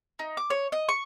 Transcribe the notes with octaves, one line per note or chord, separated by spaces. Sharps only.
D#4
D6
C#5
D#5
C#6